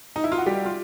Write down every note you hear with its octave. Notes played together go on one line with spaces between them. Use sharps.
D#4
E4
F4
F#4
G3 G4
F4